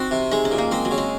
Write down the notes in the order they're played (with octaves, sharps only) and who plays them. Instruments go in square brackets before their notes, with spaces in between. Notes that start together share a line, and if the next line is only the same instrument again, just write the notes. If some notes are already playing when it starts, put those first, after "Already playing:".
Already playing: [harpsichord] C4 [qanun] D#4 F#4
[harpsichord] C3
[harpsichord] G#3 [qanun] D#4
[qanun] C#4
[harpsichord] A#2
[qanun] A#3
[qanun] G#3 [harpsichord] C4
[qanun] F#3
[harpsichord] C#3
[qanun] G#3